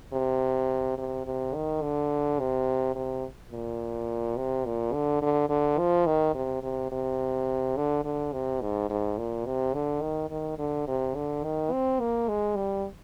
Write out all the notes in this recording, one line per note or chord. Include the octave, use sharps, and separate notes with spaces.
C3
C3
C3
D#3
D3
C3
C3
A#2
C3
A#2
D3
D3
D3
F3
D#3
C3
C3
C3
D3
D3
C3
G#2
G#2
A#2
C3
D3
D#3
D#3
D3
C3
D3
D#3
C4
A#3
G#3
G3